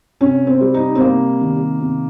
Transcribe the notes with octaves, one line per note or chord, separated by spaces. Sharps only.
C3 C#4
C4
G3
D#4
C4
C3 A#3
D#3
C3